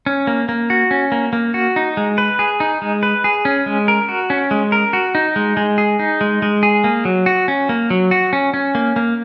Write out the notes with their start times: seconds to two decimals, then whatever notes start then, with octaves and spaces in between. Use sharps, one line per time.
0.06 C#4
0.27 A#3
0.49 A#3
0.70 F#4
0.91 C#4
1.12 A#3
1.33 A#3
1.54 F#4
1.76 D#4
1.97 G#3
2.18 B4
2.39 G#4
2.60 D#4
2.82 G#3
3.03 B4
3.24 G#4
3.45 C#4
3.66 G#3
3.88 A#4
4.09 F#4
4.30 C#4
4.51 G#3
4.72 A#4
4.93 F#4
5.15 D#4
5.36 G#3
5.57 G#3
5.78 G#4
5.99 D#4
6.21 G#3
6.42 G#3
6.63 G#4
6.84 A#3
7.05 F#3
7.26 F#4
7.48 C#4
7.69 A#3
7.90 F#3
8.11 F#4
8.33 C#4
8.54 C#4
8.75 A#3
8.96 A#3